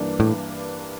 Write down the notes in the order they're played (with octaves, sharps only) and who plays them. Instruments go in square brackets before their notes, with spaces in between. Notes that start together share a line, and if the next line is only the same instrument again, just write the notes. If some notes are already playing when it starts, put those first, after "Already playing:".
Already playing: [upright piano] G2 E3 A#3 D4
[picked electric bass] A2